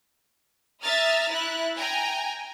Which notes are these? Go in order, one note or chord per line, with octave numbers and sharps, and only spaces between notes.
E5 A#5 D#6 F6 A6
E4 F#6
G5 G#5 A#5